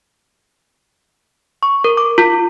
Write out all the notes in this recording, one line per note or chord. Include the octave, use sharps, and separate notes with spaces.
C#6
A#4
D6
F4